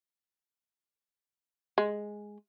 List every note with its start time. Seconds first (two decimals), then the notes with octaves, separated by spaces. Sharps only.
1.78 G#3